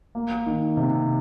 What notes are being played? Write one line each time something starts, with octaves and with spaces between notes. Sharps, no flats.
A#3
D#3
C3